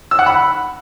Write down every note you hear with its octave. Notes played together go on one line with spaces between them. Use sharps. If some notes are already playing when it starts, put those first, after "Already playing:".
E6
F#5
B5